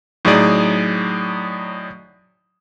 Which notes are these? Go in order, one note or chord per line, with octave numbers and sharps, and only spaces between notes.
A2 F#3 D#4 G#4 D5